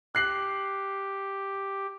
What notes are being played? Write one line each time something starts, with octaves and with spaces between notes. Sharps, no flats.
G4 F#6 C7 F#7